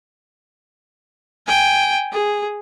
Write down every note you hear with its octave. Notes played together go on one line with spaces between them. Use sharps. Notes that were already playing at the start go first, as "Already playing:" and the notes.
G5 G#5
G#4